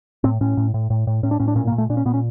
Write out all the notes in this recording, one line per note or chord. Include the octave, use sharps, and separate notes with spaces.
A2 C4
A2 C#4
A2
A2
A2
A2
A2 C#4
D4
A2 C#4
D4
A#2 C#4
A#3
A#2
A3
A#2 D4
C#4
A#2 B3
C#4